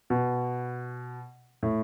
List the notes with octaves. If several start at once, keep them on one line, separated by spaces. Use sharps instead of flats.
B2
A2